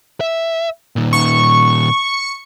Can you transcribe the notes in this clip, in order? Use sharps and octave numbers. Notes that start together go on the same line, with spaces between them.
E5
A#2 D#3
C#6